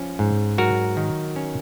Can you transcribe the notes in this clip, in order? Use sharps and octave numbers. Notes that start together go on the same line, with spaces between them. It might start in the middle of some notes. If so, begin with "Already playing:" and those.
Already playing: F3 C#4
G#2
F#3 F#4 A#4
D#3
C#4